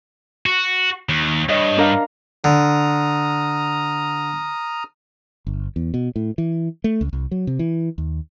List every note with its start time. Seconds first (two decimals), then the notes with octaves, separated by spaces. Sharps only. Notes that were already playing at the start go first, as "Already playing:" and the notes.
0.46 F#4
1.09 D#2
1.49 G2 C#5 D#5
1.77 D4 A#4 F5
2.44 D3 A#5 D#6 F6
5.47 G1
5.76 E2
5.94 B2
6.16 A2
6.38 E3
6.84 A3
7.01 C#2
7.13 C2
7.31 F#3
7.47 C3
7.59 E3
7.98 D#2